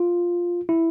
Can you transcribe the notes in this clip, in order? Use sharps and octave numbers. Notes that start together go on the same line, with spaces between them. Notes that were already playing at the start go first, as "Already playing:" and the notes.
Already playing: F4
E4